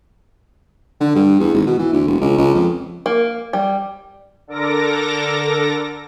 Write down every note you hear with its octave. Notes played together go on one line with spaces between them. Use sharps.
D3
G2
E2
G#1
B2
E3
D2
E1
C#2
C#2
F2
A#3
G3
D3 A4 A#4 D6 A#6